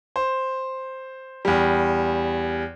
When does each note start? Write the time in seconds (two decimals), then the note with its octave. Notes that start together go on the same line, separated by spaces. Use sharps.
0.16 C5
1.45 E2 G3